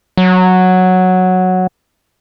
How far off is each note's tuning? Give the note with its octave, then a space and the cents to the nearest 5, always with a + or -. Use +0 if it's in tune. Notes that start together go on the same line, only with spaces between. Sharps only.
F#3 -5